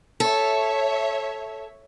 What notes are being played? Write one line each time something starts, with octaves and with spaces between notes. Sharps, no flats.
A4 C#5 E5